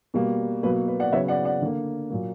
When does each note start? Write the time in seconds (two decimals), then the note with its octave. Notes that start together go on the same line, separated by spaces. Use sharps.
0.14 B2 G3 A#3
0.63 B2 F#3 A#3 B4
0.88 B4
1.00 D5 F#5
1.12 C#3 F#3 B3 C#5 E5
1.28 D5 F#5
1.45 D5 F#5
1.62 D3 A#3
2.10 A#2 F#3 A#3